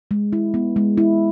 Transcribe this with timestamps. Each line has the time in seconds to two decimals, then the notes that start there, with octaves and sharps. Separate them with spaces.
0.11 G#3
0.33 E4
0.54 B3
0.76 G#3
0.98 E4